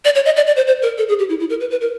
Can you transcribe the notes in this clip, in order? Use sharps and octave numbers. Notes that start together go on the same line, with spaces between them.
D5
C#5
D#5
D5
D5
C5
C5
A#4
A4
G#4
G4
E4
E4
A#4
B4
B4
A#4